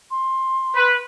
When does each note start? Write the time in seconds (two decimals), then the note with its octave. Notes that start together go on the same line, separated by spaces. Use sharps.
0.11 C6
0.75 B4